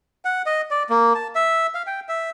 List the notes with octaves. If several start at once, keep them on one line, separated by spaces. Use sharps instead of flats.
F#5
D#5
D5
A#3
A5
E5
F5
G5
E5